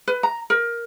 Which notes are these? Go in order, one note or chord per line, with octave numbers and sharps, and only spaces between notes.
B4
A#5
A#4